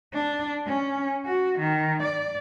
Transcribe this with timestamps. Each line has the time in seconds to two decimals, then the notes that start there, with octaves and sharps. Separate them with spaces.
0.14 D4
0.66 C#4
1.26 F#4
1.59 D#3
2.02 D5